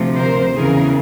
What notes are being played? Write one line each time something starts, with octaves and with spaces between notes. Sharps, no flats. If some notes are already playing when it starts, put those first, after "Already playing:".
Already playing: D2 C3 F3
A#4 C5
E2 C#3 E3 G#4 A#4